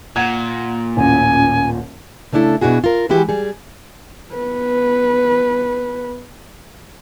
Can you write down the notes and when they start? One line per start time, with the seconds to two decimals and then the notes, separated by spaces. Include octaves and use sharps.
0.16 A#2 F#5 G#6
0.97 D#1 A1 C#4 G#5
2.33 C#3 A3 D4 E4 A4
2.61 B2 D4 E4 F#4 G#4
2.84 F4 A#4
3.09 E3 G#3 E4 F#4 G4
3.29 G3 G#4
4.34 B3 B4